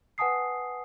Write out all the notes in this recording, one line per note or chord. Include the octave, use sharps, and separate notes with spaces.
B4 F#5 G#5 A5 D#6 C7